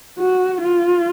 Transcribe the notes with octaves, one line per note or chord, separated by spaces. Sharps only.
F#4
F4